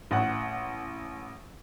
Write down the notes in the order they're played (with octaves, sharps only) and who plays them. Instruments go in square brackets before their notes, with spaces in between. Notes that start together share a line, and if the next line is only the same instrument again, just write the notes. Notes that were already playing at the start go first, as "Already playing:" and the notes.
[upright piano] A1 F#5